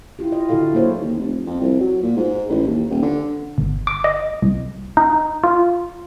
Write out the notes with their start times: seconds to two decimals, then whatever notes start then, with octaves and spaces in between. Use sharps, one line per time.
0.19 E4 F4 G4
0.32 D#5
0.49 D3 E4 F#4 A4 F5
0.73 F#3 A#3 G#4 C5 C#5
1.01 D#2
1.17 F1
1.46 F2
1.61 C2
1.80 F#3
2.03 A#2
2.17 G#2
2.49 A1
2.66 D#2
2.90 D#1
3.02 D3
3.58 G1
3.87 D6
4.04 D#5
4.42 C2
4.97 D#4
5.44 F4